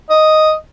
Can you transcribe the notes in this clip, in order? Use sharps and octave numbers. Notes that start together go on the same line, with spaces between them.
D#5